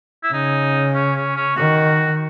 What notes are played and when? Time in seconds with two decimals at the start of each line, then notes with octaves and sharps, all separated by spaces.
0.23 E4
0.33 C#3 D#4
0.94 C#4
1.16 C#4
1.36 C#4
1.56 D#3 F#4